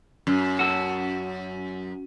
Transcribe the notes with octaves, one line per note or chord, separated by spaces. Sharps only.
F#2
F#4 A4